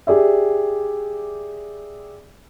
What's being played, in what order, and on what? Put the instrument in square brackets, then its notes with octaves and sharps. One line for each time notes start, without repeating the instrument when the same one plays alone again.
[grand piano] G4 G#4 D5 E5